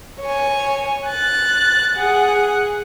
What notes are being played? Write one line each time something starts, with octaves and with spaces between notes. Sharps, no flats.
C#5 G#5
F#6 A6
G#4 F#5